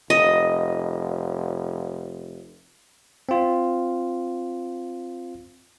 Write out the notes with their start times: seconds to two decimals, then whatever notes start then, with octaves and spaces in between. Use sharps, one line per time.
0.10 F1 D#5
3.29 C4 F4